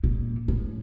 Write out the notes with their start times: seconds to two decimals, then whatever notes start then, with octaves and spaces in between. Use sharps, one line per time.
0.04 A#2
0.48 A2